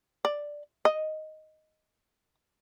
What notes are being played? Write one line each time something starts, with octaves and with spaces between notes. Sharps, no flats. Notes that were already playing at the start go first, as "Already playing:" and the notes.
D5
D#5